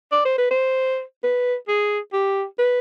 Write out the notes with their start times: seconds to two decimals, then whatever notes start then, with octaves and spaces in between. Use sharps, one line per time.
0.12 D5
0.25 C5
0.38 B4
0.51 C5
1.23 B4
1.68 G#4
2.13 G4
2.58 B4